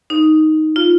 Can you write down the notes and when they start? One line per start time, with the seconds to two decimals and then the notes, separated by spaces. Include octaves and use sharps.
0.10 D#4
0.76 F4